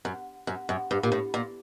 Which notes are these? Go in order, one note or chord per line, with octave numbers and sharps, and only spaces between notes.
F#2
F#2
F#2
G2
A#2
A2
A#2